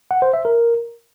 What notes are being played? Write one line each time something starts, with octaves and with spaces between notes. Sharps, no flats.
F#5
C5
E5
A#4